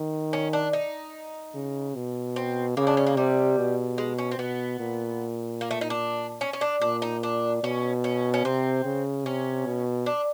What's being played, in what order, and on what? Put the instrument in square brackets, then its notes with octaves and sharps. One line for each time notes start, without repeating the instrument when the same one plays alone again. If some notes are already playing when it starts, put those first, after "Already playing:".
Already playing: [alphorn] D#3
[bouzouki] C#4
D4
D#4
[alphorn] C#3
B2
[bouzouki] C4
[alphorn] C#3 [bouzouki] A#3
[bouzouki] D4
C#4
A#3
[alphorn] C3 [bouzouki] G3
[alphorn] B2
[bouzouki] G#3
C#4
C4
[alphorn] B2 [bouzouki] B3
[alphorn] A#2
[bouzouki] A#3
A3
D#4
D4
C#4
C#4
D4
[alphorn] A#2 [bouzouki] D4
[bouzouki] D#4
D4
[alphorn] B2 [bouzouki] C#4
[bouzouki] C#4
C#4
[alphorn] C3 [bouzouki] C4
[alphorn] C#3
[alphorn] C3 [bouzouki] C#4
[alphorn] B2
[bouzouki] D4